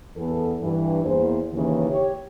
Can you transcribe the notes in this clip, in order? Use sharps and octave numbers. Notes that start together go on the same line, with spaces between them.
E2 B3 A4
G2 E3
E2 A#3 C5
D#2 C#3 E3
G4 C#5